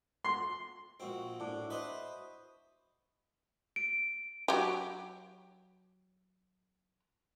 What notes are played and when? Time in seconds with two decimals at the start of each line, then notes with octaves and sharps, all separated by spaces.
0.25 C6
1.00 A#1 C4 F#4 F#5 E6
1.40 A2 D4
1.70 B4 C5 D#5 E5
3.76 D7
4.48 F#3 G4